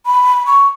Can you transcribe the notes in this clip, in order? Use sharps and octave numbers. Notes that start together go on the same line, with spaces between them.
B5
C#6